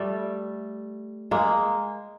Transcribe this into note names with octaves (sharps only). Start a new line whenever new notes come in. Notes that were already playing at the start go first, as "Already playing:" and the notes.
Already playing: G3 A3
G#3 A#3